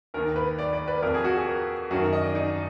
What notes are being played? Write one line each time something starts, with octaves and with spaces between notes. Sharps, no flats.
D#2 D#3 A#4
B4
D5
D5
B4
F2 F3 A#4
G#4
F#4
G#4
A#4
F#2 D#3 F#4
A#4
D#5
D5
D#4